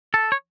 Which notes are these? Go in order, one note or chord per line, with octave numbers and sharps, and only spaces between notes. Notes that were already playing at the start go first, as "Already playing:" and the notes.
A4
C#5